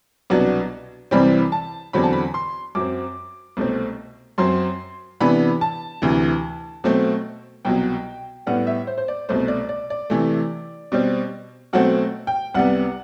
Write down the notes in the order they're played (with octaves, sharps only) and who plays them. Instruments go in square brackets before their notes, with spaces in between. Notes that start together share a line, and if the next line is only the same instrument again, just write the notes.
[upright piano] C2 B2 F#3 B3 D4
C2 C3 E3 G3 C4 B5
A5
E2 D3 F#3 C4 B5
A5
B5
C6
F#2 F#3 C4 D6
C2 B2 A3 C4
F#2 F#3 C4 C6
C3 E3 B3 D4 B5
A5
D2 C3 E3
B2 F#3 A3 C4
C2 B2 F#3 G5
A2 G3 B3 F#5
E5
C5
C5
D5
C2 B2 A3 C5
D5
D5
D5
C3 E3 A3
B2 G3 C4
B2 F#3 A3 C4 F#5
G5
C2 C3 G3 B3 F#5